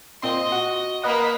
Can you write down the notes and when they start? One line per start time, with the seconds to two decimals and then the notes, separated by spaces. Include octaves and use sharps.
0.22 A#2 C4 D#5 C6
0.52 F#4
1.04 A#3 B4 D#5 F#5 B5